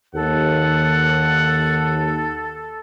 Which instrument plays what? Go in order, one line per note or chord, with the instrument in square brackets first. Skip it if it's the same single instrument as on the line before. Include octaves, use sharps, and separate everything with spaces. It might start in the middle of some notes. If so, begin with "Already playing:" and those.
[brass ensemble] D#2 [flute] A4 [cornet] F#5